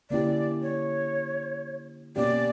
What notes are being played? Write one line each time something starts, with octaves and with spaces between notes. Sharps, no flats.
D3 A#3 C#4 E4 G4 D5
C#5
B2 A#3 C#4 G4 D5